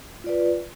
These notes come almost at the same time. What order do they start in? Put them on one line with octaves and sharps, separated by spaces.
F4 D5 B4